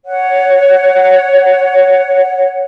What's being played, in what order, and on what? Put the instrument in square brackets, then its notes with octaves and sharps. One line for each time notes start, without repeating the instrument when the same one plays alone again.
[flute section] C#5 F#5